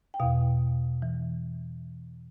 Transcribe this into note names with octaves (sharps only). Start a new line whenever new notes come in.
G5
E2 B2 F5
E3